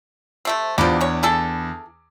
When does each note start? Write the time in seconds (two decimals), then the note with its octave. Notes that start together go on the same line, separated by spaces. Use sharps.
0.45 C3 A3 C4
0.78 E2 F3 D4 G4 B5
1.01 C#4 C#5
1.23 E4 G#4 A4